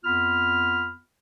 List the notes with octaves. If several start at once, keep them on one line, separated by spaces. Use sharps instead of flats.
F2 B3 F4 B5 F6